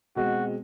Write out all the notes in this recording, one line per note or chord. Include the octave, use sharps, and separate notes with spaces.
B2 G#3 C4 F#4